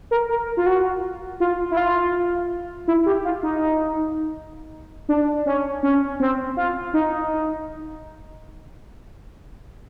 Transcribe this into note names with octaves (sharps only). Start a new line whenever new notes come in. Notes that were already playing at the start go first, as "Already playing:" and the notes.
A#4
A#4
F4
F#4
F4
E4
F4
E4
G4
F4
D#4
D4
C#4
C#4
C4
F4
D#4